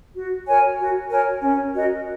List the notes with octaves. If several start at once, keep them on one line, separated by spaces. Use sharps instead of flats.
F#4
A#4 C#5 G#5
F#4
A#4 C#5 G#5
C#4
F#4 A#4 D#5